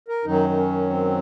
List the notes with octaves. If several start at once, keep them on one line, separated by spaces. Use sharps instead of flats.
A#4
F#2 D#3 F#3 D#4
D#4
C#4
C4